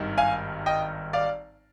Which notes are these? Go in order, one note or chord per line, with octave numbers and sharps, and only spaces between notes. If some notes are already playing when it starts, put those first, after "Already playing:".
Already playing: G#1 G2 D#3
F5 G#5
D#5 G5
D5 F5